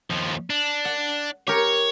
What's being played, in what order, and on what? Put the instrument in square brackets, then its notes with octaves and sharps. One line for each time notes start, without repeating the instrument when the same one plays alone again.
[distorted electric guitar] D#2 F3
D4
[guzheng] F#5
[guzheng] G4 A#4 [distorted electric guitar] C#5